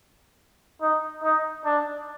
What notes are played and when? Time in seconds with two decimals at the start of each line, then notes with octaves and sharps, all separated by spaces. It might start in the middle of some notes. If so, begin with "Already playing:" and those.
0.81 D#4
1.23 D#4
1.65 D4